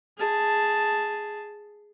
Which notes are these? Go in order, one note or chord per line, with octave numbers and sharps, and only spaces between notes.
G#4 A5